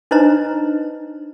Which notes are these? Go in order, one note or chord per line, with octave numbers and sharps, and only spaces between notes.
D4 D#4 B4 C5 D#5 A#5